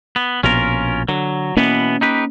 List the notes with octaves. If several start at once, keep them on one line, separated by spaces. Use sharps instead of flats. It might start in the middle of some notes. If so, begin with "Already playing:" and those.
B3
A#1 B2 C#4 F4 A#4
D3 F#3
B2 E3 A#3 B3 C#4
D#4 G4 B4